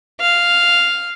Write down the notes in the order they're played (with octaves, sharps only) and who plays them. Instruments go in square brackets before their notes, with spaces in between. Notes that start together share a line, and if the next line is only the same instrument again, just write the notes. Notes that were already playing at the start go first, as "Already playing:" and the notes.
[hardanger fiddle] F5